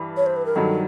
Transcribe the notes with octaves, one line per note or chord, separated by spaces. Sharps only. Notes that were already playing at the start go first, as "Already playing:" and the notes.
Already playing: G2 E3
C#5
C5
B4
A#4
G2 D#3 F#3 A4